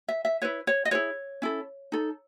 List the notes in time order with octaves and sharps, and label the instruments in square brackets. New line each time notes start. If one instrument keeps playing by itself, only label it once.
[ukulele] E5
E5
E4 B4 C#5
C#5
D#5
E4 G#4 B4 C#5
C#4 E4 A4
D#4 A4